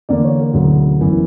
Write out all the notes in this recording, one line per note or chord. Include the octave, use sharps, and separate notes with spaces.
E2 D3 A#3 D5
C#5
A#4
E1 D2 C#3 F#3
F#1 F#2 E3 B3